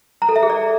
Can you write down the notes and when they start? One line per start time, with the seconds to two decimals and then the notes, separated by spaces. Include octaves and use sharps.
0.22 A#5
0.29 A4
0.36 E5
0.43 G#4
0.50 D5